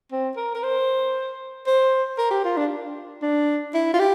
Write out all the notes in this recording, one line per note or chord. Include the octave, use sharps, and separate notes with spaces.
C4
A#4
A#4
C5
C5
A#4
G4
F4
D4
D4
E4
F4
G4